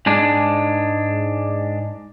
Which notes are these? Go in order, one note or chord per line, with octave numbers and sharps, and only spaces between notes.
G#2 G#3 D4